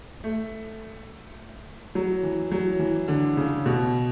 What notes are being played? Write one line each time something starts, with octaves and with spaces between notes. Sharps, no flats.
A3
F#3
E3
F#3
E3
D3
C#3
B2